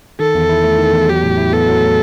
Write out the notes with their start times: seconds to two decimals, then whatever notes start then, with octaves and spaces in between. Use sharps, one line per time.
0.20 D#3 A4
0.35 E2
0.49 E4
0.64 A3
0.79 D#3
0.93 E2
1.08 F#3 G4
1.23 A2
1.38 E4
1.53 B3 A4
1.68 F#3
1.82 A2